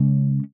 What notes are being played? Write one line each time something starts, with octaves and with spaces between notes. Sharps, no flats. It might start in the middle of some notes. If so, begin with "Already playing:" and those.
Already playing: C#3 G#3 C#4